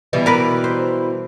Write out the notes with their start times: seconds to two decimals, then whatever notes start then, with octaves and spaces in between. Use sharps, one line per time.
0.13 B2 E3 G3
0.26 A#4 B4 D5
0.64 C5